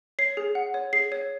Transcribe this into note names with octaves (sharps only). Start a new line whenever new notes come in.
C#5 C7
G#4
F#5
C#5
G#4 C7
C#5